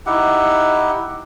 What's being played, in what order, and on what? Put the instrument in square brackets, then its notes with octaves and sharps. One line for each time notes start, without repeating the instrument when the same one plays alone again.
[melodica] D#4 E4 G4 F#5